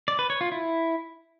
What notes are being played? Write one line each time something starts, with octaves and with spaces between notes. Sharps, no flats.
D5
B4
C#5
F4
E4